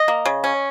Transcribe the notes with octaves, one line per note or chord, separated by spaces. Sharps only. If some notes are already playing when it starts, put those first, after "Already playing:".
Already playing: D#5
A#3
C#3
C#4